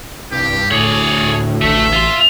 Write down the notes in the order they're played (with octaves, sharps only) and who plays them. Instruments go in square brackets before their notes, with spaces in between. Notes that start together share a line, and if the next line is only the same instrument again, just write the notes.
[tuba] C2 [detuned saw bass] G2 [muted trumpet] G4
[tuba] D2 [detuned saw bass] A2 [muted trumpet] G#4 [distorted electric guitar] C#5 D5
[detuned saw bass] A1 [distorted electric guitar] A3 [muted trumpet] E5
[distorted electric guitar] F4 C6